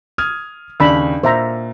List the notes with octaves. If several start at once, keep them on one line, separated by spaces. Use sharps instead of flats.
D#6 F6 G#6
D#2 C#3 D4 B5 E6
A#2 C5 E5 A#5